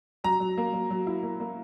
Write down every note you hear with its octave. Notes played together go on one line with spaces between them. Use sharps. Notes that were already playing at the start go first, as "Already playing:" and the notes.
F#3 A#5
F#3
A#3
F#3
F#3
E4
A#3
A#3